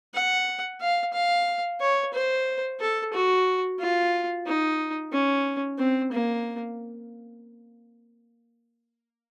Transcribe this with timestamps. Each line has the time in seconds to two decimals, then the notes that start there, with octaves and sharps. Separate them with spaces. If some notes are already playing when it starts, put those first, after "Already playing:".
0.14 F#5
0.81 F5
1.13 F5
1.81 C#5
2.14 C5
2.80 A4
3.13 F#4
3.79 F4
4.46 D#4
5.12 C#4
5.79 C4
6.12 A#3